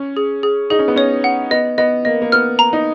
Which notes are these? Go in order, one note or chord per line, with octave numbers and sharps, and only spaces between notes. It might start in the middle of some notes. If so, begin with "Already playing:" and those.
Already playing: C#4
G#4
G#4
D#4 G#4
C#4
B3
C#4 C#5
F#5
B3 D#5
B3 D#5
A#3 D#5
A#3
B3 F6
A#5
D#4